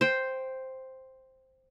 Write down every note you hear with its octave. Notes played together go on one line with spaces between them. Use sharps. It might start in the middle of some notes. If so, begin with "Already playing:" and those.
C5 G5